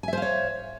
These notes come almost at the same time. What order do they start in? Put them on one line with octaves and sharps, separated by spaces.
G#5 E5 C5 F5 C#5